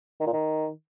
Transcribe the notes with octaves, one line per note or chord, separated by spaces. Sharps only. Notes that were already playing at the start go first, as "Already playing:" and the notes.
D#3
A#2
D#3